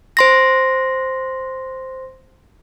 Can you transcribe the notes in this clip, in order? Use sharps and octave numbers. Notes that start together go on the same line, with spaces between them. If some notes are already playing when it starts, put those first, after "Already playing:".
C5 C6 A#6